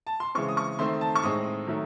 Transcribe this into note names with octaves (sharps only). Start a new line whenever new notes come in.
A5
C6
C#3 E3 G#3 C4 C#6
D#6
C#6
D#3 A3 C4 C6
A5
C#6
A2 G#3 C4 D#4 D#6
D#3 F#3 A3